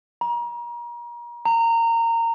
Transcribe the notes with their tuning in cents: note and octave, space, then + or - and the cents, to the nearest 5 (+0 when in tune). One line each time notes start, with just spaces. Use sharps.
A#5 +35
A#5 -20